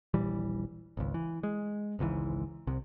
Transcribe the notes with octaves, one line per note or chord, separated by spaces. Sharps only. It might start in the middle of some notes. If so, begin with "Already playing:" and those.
D#1 A#1 E3 G3
G#1 C#2
E3
G#3
G#1 C#2 G#2 E3
C2 C3